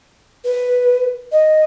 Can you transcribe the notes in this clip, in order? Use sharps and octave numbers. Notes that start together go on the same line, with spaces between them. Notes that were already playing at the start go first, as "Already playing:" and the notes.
B4
D#5